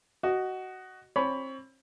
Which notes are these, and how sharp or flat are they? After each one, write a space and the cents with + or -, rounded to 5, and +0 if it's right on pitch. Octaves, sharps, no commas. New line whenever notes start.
F#4 +15 D#5 -10
C4 +30 C#5 +30 B5 +0